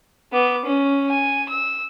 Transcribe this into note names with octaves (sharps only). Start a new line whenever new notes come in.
B3 D6
C#4
G#5
E6